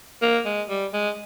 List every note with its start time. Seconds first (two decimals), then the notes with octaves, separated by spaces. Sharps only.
0.22 A#3
0.45 G#3
0.69 G3
0.93 G#3